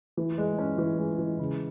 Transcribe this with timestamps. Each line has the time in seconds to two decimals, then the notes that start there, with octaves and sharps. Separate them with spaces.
0.17 E3
0.38 G#3
0.59 C#4
0.78 E3
0.98 G#3
1.19 E3
1.39 C#3